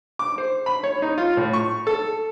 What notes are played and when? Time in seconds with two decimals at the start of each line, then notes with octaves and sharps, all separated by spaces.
0.19 D6
0.38 C5
0.66 B5
0.84 C#5
1.02 D#4
1.18 F4
1.37 A2
1.53 C#6
1.87 A4